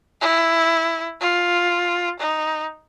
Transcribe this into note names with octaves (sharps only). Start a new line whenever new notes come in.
E4
F4
D#4